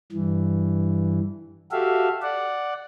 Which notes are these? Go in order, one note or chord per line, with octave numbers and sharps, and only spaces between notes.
G2 E3
F#4 G4 A4 E5 F5
D5 F#5